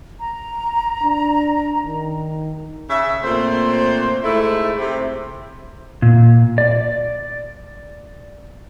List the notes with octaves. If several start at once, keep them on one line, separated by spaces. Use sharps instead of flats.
A#5
D4
D#3
C#3 E5
A#2 A3 C4 C5
G#2 A3 E4
C3
A#2
D5